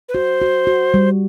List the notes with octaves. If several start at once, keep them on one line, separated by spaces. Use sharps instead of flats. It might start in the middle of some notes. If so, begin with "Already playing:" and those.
B4
F#4 C5
F#4
F#4
G3